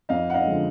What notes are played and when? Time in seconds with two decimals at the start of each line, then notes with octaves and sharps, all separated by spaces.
0.09 F2 D#5 F5
0.30 F#5
0.34 D#5 F5
0.47 D3 F3 G#3